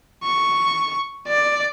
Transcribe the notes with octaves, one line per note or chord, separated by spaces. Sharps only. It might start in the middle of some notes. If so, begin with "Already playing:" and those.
C#6
D5